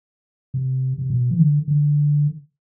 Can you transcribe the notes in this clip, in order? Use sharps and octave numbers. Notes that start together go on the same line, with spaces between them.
C3
C3
B2
E3
D3
D3